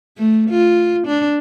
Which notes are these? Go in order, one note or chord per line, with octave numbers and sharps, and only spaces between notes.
A3
F4
D4